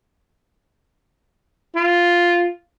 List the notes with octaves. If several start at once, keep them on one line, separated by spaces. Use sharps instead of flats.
F4